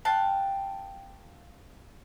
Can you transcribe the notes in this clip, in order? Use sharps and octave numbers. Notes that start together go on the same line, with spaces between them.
F5 G5 A5 F#6